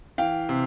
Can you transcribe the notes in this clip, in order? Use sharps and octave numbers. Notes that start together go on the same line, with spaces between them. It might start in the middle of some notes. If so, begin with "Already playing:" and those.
E3 F5 G5
C3